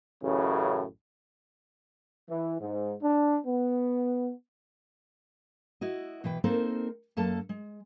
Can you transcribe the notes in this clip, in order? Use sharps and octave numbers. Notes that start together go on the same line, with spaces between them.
A1 F#2 A2 C#3
E3
G#2
D4
B3
E4 F#4 D#5
B2 E3 B4 G5
A#3 C4 D#4 A4 A#4 C5
F#2 A#3 A4 A5
G#3